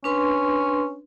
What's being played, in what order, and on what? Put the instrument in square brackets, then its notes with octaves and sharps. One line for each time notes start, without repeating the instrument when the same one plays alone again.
[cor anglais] C#4 [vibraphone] D4 B4 C6